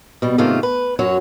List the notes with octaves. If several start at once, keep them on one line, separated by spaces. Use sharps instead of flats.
B2 G3
G#2 C3 D#3 A3 A#3 F4
B4
F#2 F#3 F#4 C#5